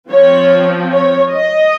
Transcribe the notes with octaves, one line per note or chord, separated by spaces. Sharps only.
F3 C4 C#5
C#5
D#5